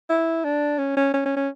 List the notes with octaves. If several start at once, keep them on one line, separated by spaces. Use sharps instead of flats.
E4
D4
C#4
C#4
C#4
C#4
C#4